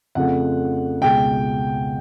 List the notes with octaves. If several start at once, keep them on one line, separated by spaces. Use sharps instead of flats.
F2 C#3 F3 A3 F#5
C#2 B2 G#3 G5